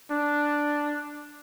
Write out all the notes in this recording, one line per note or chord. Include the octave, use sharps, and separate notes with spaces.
D4